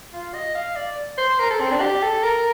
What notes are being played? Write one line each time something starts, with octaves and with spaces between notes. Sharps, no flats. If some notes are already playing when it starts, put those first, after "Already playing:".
F4
D#5
F5
D5
C5
A#4
A4
C4
D4
G4
A4
A#4